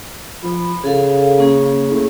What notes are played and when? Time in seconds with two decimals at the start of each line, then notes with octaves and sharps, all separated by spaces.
0.43 F3 B5
0.84 C#3 G#4 A4 F5
1.38 A#3 C#4 G#4
1.91 A2